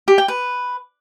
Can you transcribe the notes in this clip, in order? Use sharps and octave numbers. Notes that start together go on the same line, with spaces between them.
G4
G5
B4